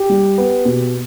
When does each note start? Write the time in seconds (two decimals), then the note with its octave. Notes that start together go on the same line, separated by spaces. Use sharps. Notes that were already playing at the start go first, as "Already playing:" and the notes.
Already playing: G4
0.10 G3
0.38 B3
0.65 B2